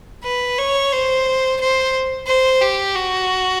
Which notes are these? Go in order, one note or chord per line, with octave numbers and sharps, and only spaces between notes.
B4
C#5
C5
C5
C5
G4
F#4